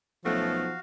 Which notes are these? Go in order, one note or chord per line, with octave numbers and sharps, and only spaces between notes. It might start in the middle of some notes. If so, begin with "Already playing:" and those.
B1 F3 A3 B3 C#4 F#4 F5